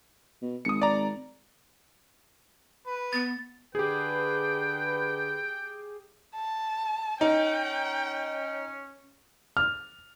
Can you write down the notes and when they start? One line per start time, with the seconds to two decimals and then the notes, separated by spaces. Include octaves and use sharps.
0.42 B2
0.65 G#1 D#6 C#7
0.82 D5 A#5
2.87 B4
3.13 B3 A6
3.75 D3 G4 G#4 B4 G5
6.34 A5
7.21 C#4 D#4 G5
9.57 F6